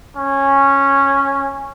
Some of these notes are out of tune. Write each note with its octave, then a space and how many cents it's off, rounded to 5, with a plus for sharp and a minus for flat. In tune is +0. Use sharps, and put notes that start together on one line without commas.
C#4 -10